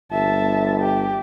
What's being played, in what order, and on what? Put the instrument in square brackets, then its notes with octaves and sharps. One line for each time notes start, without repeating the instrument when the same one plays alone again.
[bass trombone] G1 [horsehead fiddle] E5 A5
[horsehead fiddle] G4